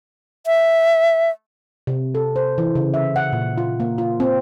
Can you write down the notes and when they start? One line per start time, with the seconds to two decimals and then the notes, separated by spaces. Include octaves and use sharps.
0.47 E5
1.87 C3
2.15 A4
2.36 C5
2.58 E3
2.75 C#3
2.94 E5
3.16 F#5
3.33 A#2
3.58 F4
3.80 A#3
3.98 F4
4.20 C4